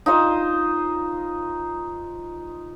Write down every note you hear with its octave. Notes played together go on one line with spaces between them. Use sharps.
D#4 F4 C5